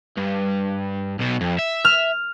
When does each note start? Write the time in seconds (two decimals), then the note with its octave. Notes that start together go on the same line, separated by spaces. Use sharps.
0.17 G2
1.19 B1 B2
1.41 F2
1.59 E5
1.85 F6